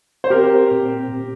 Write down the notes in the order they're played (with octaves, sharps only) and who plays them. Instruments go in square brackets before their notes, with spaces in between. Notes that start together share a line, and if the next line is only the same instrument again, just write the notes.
[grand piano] C5
[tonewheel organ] C4 [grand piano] G4 A#4
[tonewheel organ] A#2
A#2